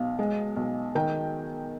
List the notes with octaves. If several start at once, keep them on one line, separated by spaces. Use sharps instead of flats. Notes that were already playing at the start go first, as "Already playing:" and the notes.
Already playing: B1 F5
G#3
B1
D#3 G5